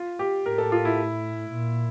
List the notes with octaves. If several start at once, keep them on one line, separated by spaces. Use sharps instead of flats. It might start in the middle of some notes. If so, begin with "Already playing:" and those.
Already playing: F4
G4
A2 A#4
A4
F4
E4
A#2